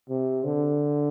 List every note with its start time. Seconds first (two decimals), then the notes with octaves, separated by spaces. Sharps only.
0.09 C3
0.44 D3